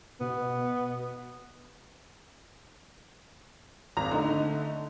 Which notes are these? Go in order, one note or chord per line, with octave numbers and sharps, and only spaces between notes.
B2 B3
G#1 A#5
D3 A3 D#4